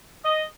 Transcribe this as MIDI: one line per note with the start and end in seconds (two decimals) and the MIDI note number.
0.25 0.45 75